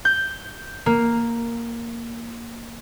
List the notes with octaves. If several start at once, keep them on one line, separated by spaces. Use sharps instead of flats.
G6
A#3